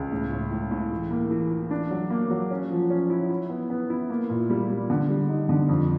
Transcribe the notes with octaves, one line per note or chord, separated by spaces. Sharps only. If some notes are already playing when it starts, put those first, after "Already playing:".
Already playing: C#2
A2
A2
A2
A2
E3
A#3
E3
E3
D4
F#3
A#3
F#3
C#4
F3
C#4
E4
E4
B3
B3
E4
A#3
A#2
G3
G3
D3
G3
D#4
D3
F2